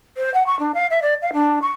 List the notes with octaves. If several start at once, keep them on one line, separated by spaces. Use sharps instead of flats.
C5
F#5
C#6
D4
F5
E5
D5
F5
D4
C#6